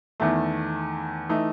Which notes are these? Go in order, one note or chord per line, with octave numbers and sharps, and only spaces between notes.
E2 D#3 A3
E3 A3 D#4